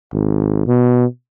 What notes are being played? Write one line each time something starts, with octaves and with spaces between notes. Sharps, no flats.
G#1
B2